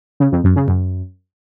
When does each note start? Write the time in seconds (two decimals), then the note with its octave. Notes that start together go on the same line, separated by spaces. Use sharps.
0.20 C#3
0.32 F2
0.44 F#2
0.56 C#3
0.68 F#2